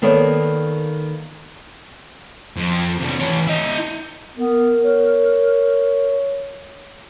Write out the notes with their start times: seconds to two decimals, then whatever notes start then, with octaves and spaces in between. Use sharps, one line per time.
0.02 D#3 A#3 B3 A4 C#5 D5
2.56 F2
3.00 C3 D4
3.20 E3 C#5
3.47 E4 D#5
4.38 B3 A#4
4.84 C#5